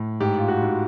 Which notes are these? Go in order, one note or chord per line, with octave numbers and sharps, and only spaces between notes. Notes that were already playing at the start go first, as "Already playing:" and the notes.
Already playing: A2
G#2 G4
F4
F#4
G#2